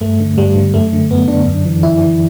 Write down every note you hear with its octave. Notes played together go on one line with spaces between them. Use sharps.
G2 A3
D3
G2 G3
D3
F#2 A3
D3
F#2 B3
D3 D4
F#2
E3
F#2 E4
E3